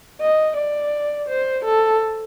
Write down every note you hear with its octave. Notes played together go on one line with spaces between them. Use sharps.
D#5
D5
C5
A4